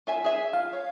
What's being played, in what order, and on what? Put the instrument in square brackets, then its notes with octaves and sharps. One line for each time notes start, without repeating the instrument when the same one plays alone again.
[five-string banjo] F4 E5 G#5
G#4 E5 G#5
[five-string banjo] F4 [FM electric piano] F5
[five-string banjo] C#5